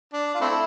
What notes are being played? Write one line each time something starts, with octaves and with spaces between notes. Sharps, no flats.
D4
F4
A3 C4 E4